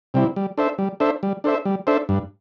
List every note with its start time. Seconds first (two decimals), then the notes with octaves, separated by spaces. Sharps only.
0.14 C3 G3 C4 E4
0.36 G3
0.58 D4 A4 C5 E5
0.78 G3
1.00 D4 A4 C5 E5
1.23 G3
1.44 D4 A4 C5 E5
1.65 G3
1.87 D4 A4 C5 E5
2.09 G2